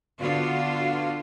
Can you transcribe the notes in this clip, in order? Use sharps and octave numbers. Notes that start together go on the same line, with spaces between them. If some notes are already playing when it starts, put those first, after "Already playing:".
D3 B3 F4 F#4